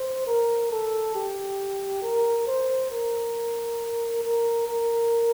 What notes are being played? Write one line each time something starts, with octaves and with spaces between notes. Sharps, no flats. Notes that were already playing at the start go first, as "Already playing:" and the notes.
Already playing: C5
A#4
A4
G4
A#4
C5
A#4
A#4
A#4